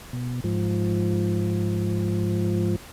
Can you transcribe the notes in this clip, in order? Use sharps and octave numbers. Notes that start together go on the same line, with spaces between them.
B2
G#2 F3